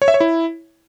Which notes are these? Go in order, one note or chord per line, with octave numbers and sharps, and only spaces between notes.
C#5
E5
C#5
E4